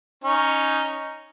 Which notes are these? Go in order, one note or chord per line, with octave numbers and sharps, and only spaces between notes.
C#4 D#4